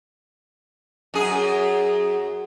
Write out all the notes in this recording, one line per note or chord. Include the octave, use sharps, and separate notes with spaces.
F#2 G#4